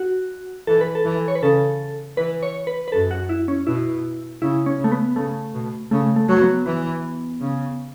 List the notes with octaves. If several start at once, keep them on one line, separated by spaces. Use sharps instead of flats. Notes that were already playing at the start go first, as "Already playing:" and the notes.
Already playing: F#4
E3 A4
B4
A4
E3
C#5
B4
C#3 A4
E3 B4
C#5
B4
B4
F#2 A4
F#4
E4
C#4
B2 E4
C#3 E4
C#4
C#3
A3
B3
C#3 A3
B2
C#3 A3
A3
F#3
B3
E3 B3
C#3